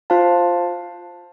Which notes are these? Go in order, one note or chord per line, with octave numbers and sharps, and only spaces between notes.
F4 C5 F5 A5